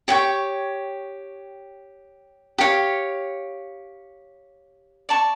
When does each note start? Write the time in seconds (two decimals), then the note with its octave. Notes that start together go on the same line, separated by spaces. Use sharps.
0.08 G4 C#5 G5 C#6
2.58 G4 C#5 F5
5.09 D5 A5 C#6